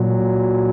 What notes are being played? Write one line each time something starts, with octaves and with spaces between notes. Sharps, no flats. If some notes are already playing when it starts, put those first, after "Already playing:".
Already playing: A#2 F#3